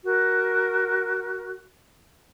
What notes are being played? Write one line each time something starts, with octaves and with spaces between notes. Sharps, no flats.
F#4 A#4